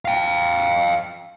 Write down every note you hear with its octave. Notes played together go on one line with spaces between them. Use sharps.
F5 G5